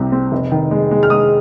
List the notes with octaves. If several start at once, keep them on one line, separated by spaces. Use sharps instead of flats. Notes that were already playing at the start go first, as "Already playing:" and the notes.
Already playing: C2 C3 C4
C4
F1
D#3
G#3
G#3
F6
G#3 D#6